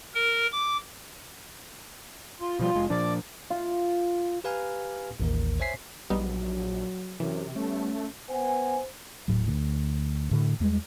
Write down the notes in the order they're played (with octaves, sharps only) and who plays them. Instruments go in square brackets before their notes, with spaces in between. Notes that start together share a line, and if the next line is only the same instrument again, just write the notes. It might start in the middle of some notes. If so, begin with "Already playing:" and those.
[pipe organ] A#4
D6
[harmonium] F4
[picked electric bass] B2 F3 G3 [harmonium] F4
[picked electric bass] F1 G#3
[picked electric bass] A#2 F3 D4 [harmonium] D5
[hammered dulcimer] F4
[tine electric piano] G4 B4 F5 G#5 A#5 F6
A1 D#2 A#4
C5 C#5 E5 G#5 B6 C7
[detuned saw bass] A#1 [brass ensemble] F#3 [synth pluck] G3 B3 D#4
[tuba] F#2 [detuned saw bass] C3 [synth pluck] E3
[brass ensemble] G3 B3 [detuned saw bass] A3 [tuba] C#4
[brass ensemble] B3 F#5 G#5 [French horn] C5
[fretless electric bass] D#1 A2 F#3
D2
A2 D3
E2 G3 G#3